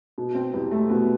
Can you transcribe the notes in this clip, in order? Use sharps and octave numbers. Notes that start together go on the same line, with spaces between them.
B2
C4
E2 G3
A3
B2 B3